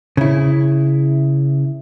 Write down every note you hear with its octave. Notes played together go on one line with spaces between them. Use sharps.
C#3 E4